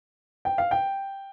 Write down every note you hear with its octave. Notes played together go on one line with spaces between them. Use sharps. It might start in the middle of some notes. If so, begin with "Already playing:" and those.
G5
F5
G5